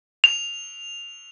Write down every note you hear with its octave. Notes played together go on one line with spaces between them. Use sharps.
F7